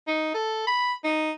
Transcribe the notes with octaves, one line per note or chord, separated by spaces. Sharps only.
D#4
A4
B5
D#4